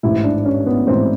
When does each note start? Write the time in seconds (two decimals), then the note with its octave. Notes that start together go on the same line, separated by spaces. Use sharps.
0.03 A1 G#2 E3 E4
0.24 D4
0.45 C#4
0.66 B3
0.86 A1 G#2 E3 C4